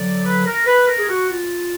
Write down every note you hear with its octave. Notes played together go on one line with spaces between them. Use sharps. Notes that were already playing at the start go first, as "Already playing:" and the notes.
Already playing: D3 F#3 D5
B4
A#4
B4
A#4
G#4
F#4
F4